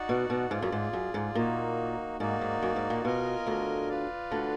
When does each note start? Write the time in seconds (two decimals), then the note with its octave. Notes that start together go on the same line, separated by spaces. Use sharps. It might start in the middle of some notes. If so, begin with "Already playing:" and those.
Already playing: D#4 F#4 D5 F#5
0.09 B2
0.30 B2
0.51 G#2 F4 G#4 D5
0.62 F#2
0.72 G#2
0.93 F#2
1.14 G#2
1.35 A#2 A#3 D#4 F#4
2.19 G#2 A#3 D#4 F#4 D5
2.41 G#2
2.62 F#2
2.76 G#2
2.90 A#2
3.04 B2 F4 A#4 D#5 G#5
3.47 D2 D3
3.89 F4 B4 D5 F5
4.31 D2 D3